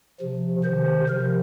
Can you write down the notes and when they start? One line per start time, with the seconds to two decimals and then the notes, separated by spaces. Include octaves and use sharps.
0.20 C3 F3
0.64 C3 D#3 C5
1.09 C3 F3 A#4